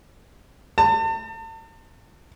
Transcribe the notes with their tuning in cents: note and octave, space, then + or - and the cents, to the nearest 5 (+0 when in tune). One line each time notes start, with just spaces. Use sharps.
A5 +40